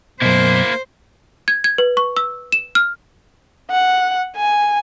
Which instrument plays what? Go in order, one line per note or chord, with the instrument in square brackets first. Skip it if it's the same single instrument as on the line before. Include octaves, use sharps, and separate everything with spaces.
[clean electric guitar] F#2 B2 [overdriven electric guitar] A#3 E4 [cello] C5
[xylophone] G#6
G#6
B4
C#6
E6
E7
F6
[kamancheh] F#5
G#5